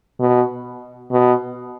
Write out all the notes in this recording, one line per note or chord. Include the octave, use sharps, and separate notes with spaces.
B2
B2